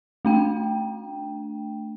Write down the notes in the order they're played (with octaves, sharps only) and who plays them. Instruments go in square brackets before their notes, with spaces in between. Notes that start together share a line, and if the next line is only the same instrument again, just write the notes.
[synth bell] A3 D4 G5